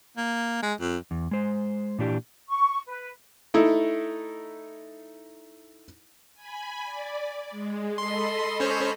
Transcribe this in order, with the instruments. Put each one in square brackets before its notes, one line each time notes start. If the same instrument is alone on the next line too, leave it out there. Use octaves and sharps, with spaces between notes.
[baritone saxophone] A#3
G#3
F2
[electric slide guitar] E2
G#3 C5
A#2 E3 D4 G4
[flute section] C#6
B4
[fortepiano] A3 D#4 E4
[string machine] G#5 B5
D5
G#3
[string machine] A4 D#5 B5 [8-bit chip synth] C6
[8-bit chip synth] C#4 C5 C#5